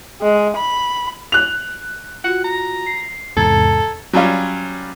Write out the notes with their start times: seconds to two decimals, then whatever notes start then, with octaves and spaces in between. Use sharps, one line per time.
0.22 G#3
0.56 B5
1.32 F#6 F7
2.24 F4 F#4 F#5
2.44 A#5
2.86 C7
3.37 E2 G#2 C3 A4 A#5 G#6
4.13 F#3 G3 C#4 F4